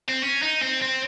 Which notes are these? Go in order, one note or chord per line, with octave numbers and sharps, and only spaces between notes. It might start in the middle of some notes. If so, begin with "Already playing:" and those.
C4
C#4
D#4
C4
C4